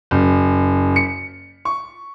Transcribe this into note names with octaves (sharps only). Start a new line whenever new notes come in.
F#1
C#7
C#6